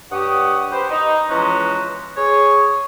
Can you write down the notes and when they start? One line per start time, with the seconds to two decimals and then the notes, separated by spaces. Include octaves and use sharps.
0.11 G2 G4 C#5 F#5 D#6
0.72 G4 B4 C5
0.90 D#4
1.30 E3 F3 G#3 C#4 B4 A#5
2.17 G#4 C#5